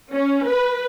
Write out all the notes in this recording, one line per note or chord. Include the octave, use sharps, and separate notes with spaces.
C#4
B4